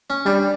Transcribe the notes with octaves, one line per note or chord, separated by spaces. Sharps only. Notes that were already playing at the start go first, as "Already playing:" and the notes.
C#4
G3 D4